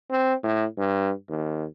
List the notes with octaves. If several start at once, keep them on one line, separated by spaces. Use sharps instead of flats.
C4
A2
G2
D#2